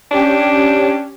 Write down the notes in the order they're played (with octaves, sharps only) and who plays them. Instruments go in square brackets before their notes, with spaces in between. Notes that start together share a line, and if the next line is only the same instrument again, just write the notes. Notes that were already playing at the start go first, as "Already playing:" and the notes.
[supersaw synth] C#4 G4 [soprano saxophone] D4